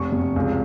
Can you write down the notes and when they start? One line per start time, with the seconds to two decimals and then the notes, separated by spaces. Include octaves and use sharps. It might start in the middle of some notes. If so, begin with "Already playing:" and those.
Already playing: F1 C#6
0.12 F1
0.36 C#2